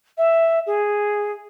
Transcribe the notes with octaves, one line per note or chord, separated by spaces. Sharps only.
E5
G#4